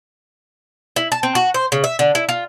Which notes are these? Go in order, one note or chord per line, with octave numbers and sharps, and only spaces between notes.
E4
A5
C4
F#4
C5
C#3
E5
D3
E4
F4